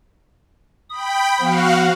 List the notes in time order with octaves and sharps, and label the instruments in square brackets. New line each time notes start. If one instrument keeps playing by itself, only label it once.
[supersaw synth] G5 B5 [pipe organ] D#6
[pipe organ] F3 B3 [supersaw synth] F#4 F5 F#5